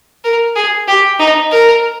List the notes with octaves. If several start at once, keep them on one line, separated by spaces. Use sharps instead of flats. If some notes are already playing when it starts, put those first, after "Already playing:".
A#4
G#4
G4
D#4
A#4